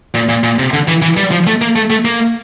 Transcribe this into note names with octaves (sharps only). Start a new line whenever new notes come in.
A#2
A#2
A#2
C3
D3
E3
E3
G3
F3
A3
A#3
A3
A3
A#3